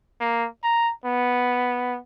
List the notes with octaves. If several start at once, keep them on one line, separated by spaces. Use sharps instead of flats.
A#3
A#5
B3